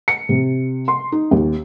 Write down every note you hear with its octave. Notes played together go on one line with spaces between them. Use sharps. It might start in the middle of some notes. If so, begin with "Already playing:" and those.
C#7
C3
C6
D#4
D#2